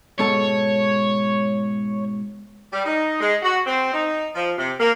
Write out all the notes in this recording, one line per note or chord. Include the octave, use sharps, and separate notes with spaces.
G#2 B2 A4 C#5
G3
D#4
G#3
F#4
C4
D#4
F3
C3
A#3